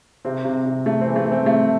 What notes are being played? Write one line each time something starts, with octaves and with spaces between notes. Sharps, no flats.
C3 C4
C3
C3
C3 A3
C4
E3
A3
E3 C4
C3 A3